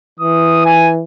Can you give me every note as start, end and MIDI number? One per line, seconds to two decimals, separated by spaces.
0.20 1.02 52
0.20 0.61 87
0.65 0.90 80